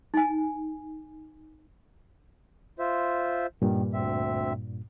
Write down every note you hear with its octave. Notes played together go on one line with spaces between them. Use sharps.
D#4 G#5
F4 C5 E5
G2 A#2 D#3
D2 C4 E5